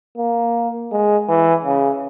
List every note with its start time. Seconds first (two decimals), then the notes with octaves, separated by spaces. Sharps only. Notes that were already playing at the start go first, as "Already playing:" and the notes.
0.18 A#3
0.92 G#3
1.29 E3
1.65 C#3